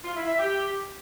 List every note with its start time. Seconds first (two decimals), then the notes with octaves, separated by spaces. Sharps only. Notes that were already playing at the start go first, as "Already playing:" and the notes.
0.04 F4
0.16 E4
0.27 E5
0.39 G4